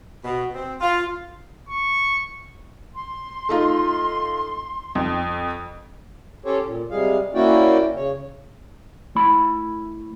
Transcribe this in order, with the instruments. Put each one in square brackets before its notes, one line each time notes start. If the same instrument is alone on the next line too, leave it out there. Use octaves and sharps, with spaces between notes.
[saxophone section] B2
C4
F4
[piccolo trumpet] C#6
[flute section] C6
[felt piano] A3 D#4 F4
F2
[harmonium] C#4 G4 A4 C5 C#5
A#2
C3 G3 G#3 G#4 F5
A#3 C#4 E4 F#4 D5 G5
C#3 C#5
[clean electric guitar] A3 E4 B5